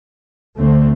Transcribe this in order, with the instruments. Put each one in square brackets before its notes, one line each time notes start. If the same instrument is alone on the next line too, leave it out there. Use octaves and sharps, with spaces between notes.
[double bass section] D2 D3 A3 C4